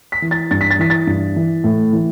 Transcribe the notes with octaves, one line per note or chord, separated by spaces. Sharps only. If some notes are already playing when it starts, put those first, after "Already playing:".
B6
E3
A6
G2 A6
B6
A6
E3 B6
A6
G2
E3
A2
E3